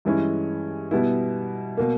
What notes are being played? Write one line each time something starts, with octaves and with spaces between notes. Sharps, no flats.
G2 E3 G#3 C#4 E4
B2 G3 B3 E4
B2 A#3